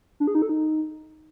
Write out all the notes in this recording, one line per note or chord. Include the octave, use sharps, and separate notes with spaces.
D4
G#4
D#4
A4
D#4